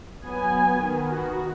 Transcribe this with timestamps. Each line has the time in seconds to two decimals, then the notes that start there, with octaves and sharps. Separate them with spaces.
0.25 F#3 B3 G#5
0.81 D#3 B3
1.10 F#4